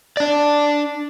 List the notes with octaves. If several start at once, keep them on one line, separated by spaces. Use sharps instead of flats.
D4 D5